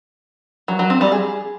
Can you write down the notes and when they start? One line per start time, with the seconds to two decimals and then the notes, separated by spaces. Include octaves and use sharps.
0.68 F#3
0.79 F#3
0.90 C4
1.01 G3
1.12 G#4